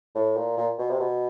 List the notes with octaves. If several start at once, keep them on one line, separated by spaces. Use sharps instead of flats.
A2
A#2
A#2
B2
C3
B2